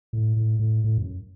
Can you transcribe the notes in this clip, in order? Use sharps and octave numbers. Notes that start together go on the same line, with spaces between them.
A2
A2
A2
A2
F#2